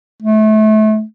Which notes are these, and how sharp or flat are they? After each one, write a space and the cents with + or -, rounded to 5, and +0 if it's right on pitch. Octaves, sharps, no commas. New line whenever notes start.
A3 -30